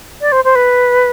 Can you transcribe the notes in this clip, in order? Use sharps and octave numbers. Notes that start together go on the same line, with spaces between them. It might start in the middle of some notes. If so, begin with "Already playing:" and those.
D5
C5
C5
B4